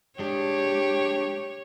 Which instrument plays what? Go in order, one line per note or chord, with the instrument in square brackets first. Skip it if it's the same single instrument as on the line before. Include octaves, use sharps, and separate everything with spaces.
[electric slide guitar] G#3 D4 [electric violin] G4 [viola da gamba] C#5